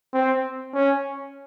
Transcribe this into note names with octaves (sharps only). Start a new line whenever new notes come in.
C4
C#4